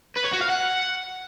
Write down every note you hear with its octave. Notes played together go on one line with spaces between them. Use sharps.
B4
C#5
F#4
F5
F#5